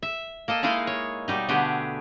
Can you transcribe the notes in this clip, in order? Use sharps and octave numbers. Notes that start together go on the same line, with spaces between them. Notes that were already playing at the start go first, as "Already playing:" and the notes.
E5
A#3 A4 D#5
G#3 A#3 D#4 E4 D#5 F5
C#5
B2 G3 D#4
B2 D3 A3 B3 G4 G#4